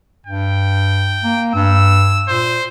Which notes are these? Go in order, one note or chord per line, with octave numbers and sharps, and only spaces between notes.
G2 G5
A#3
G2 E6
A#2 C5